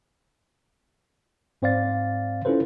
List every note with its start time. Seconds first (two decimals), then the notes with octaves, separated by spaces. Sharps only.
1.62 G#2 C4 C5 D5 F5 A6
2.45 C#4 E4 F4 A4 B4 C5